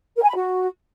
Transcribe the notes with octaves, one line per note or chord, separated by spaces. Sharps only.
A#4
G#5
B5
F#4